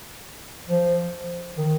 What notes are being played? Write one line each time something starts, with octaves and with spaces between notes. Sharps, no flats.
F3
D#3